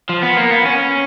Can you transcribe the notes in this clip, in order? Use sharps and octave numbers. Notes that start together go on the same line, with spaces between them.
F3
B3
A#3
B3
C#4